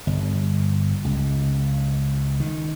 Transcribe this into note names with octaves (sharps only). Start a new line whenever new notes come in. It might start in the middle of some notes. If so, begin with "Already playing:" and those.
G1
C#2
D#3